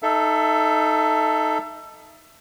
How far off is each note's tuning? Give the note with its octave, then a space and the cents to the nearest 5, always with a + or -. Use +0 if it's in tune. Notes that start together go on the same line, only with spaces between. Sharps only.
D#4 +0 A4 +0 E5 +25